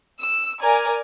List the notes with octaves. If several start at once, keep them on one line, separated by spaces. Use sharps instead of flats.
E6
A#4 D5 G#5